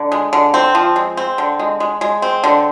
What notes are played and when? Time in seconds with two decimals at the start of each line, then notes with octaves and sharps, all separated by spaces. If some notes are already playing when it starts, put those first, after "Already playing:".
Already playing: D3
0.12 G#3
0.33 D3
0.54 C4
0.75 F3
0.96 G#3
1.17 C4
1.38 D3
1.60 G#3
1.80 G#3
2.01 G#3
2.22 C4
2.44 D3